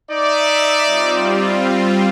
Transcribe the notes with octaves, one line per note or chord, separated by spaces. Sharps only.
D#4 D5 E5 E7
G3 C4 F4